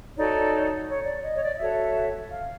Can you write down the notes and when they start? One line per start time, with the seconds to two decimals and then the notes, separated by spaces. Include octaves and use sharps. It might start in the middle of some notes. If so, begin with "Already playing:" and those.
0.18 D#4 F#4 A4 C#5 D5
0.88 C#5
1.06 D5
1.24 D#5
1.36 C#5
1.44 D5
1.52 D#5
1.59 F#4 A4 C#5 E5
2.31 F5